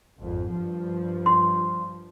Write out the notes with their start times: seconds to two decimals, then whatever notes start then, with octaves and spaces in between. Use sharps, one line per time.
0.19 G#1 F2
0.51 G2 F3
1.26 C6